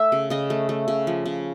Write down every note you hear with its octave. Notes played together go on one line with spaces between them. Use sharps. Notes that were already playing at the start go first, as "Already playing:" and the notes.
Already playing: A3 E5
C#3
C#3 D#5
A3
A3
C#3
F3
C#3